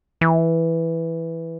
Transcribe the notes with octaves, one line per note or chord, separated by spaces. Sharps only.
E3